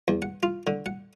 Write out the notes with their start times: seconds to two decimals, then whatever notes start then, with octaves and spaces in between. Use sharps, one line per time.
0.08 E2
0.22 F#5
0.43 F4
0.67 D3
0.86 F#5